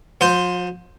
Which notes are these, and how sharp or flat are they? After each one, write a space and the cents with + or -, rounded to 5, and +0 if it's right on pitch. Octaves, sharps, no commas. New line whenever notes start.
F3 +45 C5 +0 C6 +0